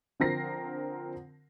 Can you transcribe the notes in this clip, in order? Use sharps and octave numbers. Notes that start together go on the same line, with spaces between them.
D3 F3 C4 A#4 A#6 C7